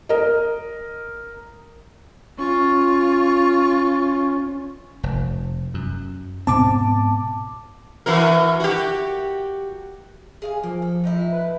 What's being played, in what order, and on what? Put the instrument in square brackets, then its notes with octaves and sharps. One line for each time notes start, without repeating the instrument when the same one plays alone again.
[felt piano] A#4 D#5
[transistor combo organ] C#4 [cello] F4 [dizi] C#6
[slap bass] F1
F#2
[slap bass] G#2 B2 C4 [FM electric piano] A5 D6
[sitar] E3 F#4 A#4
F#4 G4
[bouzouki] G#4 F5 G#5
[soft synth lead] F3 [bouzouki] A#3
[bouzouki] A4
A2 D#4 E4
[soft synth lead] B4